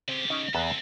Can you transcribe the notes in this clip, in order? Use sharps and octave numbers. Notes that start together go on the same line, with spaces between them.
C#3 C4 G4
C#4 D#4 C#5
E2 C4 A4 B4 A#5